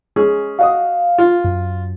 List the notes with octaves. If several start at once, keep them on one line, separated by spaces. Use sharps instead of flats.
G#3 C#4 G#4
F#4 D#5 F5 D#6
F4
F#2